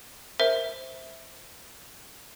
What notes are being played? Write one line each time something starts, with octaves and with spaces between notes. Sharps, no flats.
A#4 C5 E5